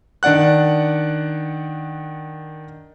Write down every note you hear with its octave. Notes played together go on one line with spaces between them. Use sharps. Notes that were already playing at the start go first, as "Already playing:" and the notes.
D#3 D4 D5 F#5 F#6